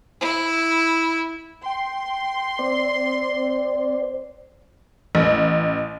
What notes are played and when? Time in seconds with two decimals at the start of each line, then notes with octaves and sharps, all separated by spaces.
0.21 E4
1.66 G5 C6
2.59 C4 C5 D5
5.15 A1